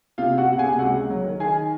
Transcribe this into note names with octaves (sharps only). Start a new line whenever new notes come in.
C3 F4 F5
C3 F#4 F#5
C3 F#5
G#4 G#5
C3
C#2 F#4 F#5
C#2
F#3
D#3
D#3 G#4 G#5